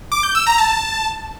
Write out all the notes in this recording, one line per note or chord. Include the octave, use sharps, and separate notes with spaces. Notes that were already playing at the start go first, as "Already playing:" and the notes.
D6
G6
E6
A#5
A5